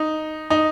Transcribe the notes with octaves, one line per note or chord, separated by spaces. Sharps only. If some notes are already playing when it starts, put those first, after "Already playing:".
Already playing: D#4
D#4